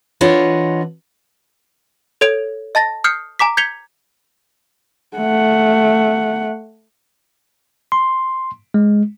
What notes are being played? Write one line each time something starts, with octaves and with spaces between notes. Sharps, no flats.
E3 D4 F4 C#5 D#5 F#5
A4 C#5 G#6 D7 F7
D#5 A5 A6 A#6
D#6 F6 G6 C7 C#7
G#5 A#5 D6 B6
G6 G#6 B6 C#7 F7 G7
A3 F#5
C6
G#3